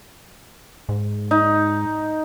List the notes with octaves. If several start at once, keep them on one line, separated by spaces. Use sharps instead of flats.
G#2
D#4